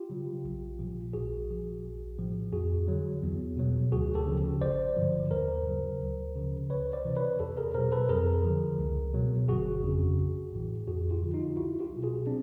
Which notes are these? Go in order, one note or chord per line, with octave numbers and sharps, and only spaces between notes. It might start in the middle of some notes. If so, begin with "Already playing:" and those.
Already playing: F4 G4
C#3 F#3
A#1
A#2 F3
A#1 F#4 G#4
A#2 F3
A#1
A2 F3
F2 F#4 G#4
D3 F#3
E2
B2 F#3
D2 F#4 G#4
G4 A4
C#3 F3
G#1 C5 D5
G2 D3 F3
D#2 A#4 C5
C#3 F#3
D2
C#3 F3
C#2 B4 C#5
C5 D5
C3 E3
B4 C#5
E2 G4 A4
G#4 A#4
B2 F#3 A#4 C5
A4 B4
F2 G#4 A#4
D3 F3
C#2
B2 F#3
G1 F#4 G#4
F2 C#3
A1
A2 E3
F2 F#4 G#4
F4 G4
D3 F3
D#4 F4
C2 E4 F#4
F4 G4
B2 F#3
F#4 G#4
C4 D4